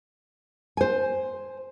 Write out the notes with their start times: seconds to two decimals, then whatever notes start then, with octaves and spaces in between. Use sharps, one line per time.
0.77 C5 G#5